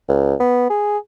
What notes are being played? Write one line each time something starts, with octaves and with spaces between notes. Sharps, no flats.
C#2
B3
G#4